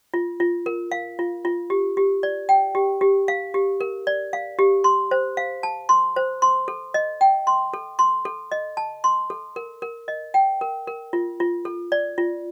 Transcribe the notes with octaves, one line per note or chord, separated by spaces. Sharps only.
F4
F4
A#4
F5
F4
F4
G4
G4
D5
G5
G4
G4
F5
G4
A#4
D5
F5
G4
C6
C5
F5
A5
C6
C5
C6
A4
D#5
G5
C6
A4
C6
A4
D#5
A5
C6
A4
A#4
A#4
D#5
G5
A#4
A#4
F4
F4
A4
D5
F4